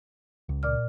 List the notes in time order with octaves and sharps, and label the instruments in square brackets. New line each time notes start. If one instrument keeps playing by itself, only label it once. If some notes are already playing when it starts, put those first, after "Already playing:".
[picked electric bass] C#2
[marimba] A#2 D5 F6